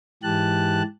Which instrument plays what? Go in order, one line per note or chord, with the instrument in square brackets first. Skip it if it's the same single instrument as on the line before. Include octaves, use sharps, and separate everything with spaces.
[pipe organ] G#2 E3 G4 A5 F#6